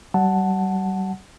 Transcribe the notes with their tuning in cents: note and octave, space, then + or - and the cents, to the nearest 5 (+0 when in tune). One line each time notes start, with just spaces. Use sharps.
G3 -40 F#5 +0 A5 +0